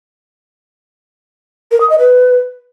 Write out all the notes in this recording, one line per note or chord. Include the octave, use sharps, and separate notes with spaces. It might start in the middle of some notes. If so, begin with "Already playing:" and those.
A#4
D#6
D#5
B4